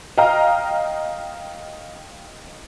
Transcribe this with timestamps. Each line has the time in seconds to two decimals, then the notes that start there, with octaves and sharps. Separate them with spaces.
0.18 D#5 F5 G5 A#5 F6